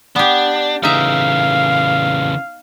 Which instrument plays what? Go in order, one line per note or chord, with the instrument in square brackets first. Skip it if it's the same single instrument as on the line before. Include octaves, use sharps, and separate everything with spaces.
[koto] B3 G4 [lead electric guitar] D4
[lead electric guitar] C#3 E3 [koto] D#4 E5 [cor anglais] F5